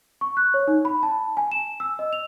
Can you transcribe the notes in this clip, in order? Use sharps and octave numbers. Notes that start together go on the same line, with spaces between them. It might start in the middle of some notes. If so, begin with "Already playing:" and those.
C#6
F#6
C#5
D#4
B5
A5
G#5
E7
E6
D#5
F7